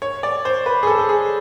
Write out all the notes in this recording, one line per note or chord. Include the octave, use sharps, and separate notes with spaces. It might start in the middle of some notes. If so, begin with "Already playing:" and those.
C#5
D5
C5
B4
G#4
A4
A4
G#4